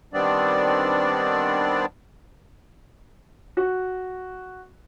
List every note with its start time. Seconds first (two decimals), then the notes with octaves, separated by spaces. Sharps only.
0.13 D#3 G3 B3 C4 D4 D5
3.57 F#4